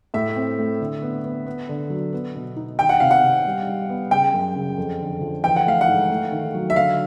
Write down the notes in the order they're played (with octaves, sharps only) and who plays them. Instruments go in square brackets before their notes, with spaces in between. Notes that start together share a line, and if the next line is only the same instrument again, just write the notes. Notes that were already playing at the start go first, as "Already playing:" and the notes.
[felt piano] A2 [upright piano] E5
[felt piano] C4
A3
D3
B3
B3
B3
D3
F#3
B3
B2
D#4
[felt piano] D#3 [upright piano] G5
[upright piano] F#5
[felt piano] C3 [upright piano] F5
[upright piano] F#5
[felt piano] C3
G3
G3
B3
[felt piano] C#3 [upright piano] G5
[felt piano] F#2
C#3
F2
D3
F3
[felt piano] E3 [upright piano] G5
[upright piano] F#5
[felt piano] A3 [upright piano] F5
[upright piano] F#5
[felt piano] G#2
A3
D#3
F#3
[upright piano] E5
[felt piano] D3 [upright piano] F5